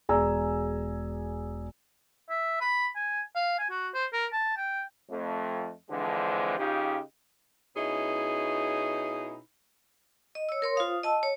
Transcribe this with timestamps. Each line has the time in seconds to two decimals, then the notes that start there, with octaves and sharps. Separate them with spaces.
0.09 E1 G#4 D5 G#5 A#5 E6
2.30 E5
2.61 B5
2.96 G#5
3.35 F5
3.59 G#5
3.70 F#4
3.94 C5
4.13 A#4
4.33 A5
4.57 G5
5.10 F2 A3
5.90 D3 E3 F3 G#3 C4 D4
6.58 C#3 D#4 F4 G4
7.75 B2 C#4 D#4 E4 G#4
10.35 D#5
10.49 C#5 E6
10.62 A#4 C#5 C6
10.76 F4 C5 F5 D#6
11.03 D#5 A5 E6
11.23 C#5